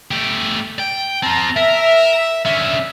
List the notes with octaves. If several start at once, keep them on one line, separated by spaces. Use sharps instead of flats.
A3 G4
G5
C4 F4 A5 A#5
A#4 E5
D3 C#4 E5